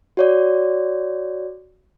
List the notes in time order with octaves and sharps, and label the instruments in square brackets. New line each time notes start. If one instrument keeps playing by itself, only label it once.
[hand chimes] F#4 C#5 D5